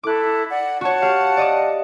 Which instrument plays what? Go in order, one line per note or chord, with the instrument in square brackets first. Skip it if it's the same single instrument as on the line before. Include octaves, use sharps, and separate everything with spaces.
[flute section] E4 A4 [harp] D6 F#6
[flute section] D5 F#5
[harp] F#4 C#5 [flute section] F#5 A5
[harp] G4 F5
D5 D#5 D6